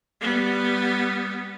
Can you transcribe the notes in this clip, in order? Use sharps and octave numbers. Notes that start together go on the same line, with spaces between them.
G3 B3